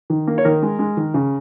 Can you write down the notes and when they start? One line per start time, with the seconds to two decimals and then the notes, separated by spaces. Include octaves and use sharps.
0.10 D#3
0.27 A#3
0.38 C#5
0.45 D#3 A#4
0.63 G#3
0.79 G#3
0.97 D#3
1.14 C#3